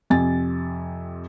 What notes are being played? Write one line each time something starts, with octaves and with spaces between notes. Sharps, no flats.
F2 C3 G#5 A6